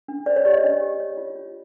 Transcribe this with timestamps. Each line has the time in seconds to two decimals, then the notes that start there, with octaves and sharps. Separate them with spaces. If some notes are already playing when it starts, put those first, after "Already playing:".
0.08 D4
0.26 C5 D5
0.36 C#5
0.45 G4 D5
0.53 D#5
0.64 D4
0.81 G4
1.00 C#5
1.17 F4
1.36 F4